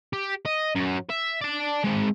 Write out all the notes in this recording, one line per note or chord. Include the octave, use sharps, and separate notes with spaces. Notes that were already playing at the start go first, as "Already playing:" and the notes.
G4
D#5
F#2 F#3
E5
D5 A5
G#3 C4